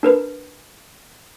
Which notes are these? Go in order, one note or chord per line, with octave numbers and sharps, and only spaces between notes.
D4 A#4 B4